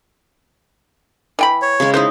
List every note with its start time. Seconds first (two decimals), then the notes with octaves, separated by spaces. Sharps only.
1.39 E3 G5 B5
1.62 C#5
1.80 C#3 G#3
1.94 D#4 E4 C5 D#5